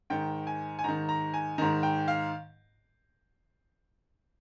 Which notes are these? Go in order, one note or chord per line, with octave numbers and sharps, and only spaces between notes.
G#2 D#3 G5
G#5
G#5
G#2 D#3 A#5
A#5
G#5
G#2 D#3 A#5
G5
F5